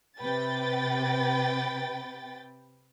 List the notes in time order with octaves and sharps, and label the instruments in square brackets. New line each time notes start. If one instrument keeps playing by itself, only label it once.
[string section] C3 B4 G5 A6